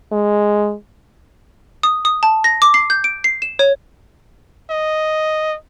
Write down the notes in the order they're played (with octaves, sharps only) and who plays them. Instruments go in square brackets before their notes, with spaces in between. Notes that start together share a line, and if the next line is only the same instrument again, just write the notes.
[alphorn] G#3
[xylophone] D#6
D#6
A5
A#6
D6
C7
G6
D7
C7
E7
C#5
[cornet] D#5